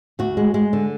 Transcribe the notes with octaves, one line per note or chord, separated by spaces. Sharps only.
D2 F#4
G#3
G#3
D3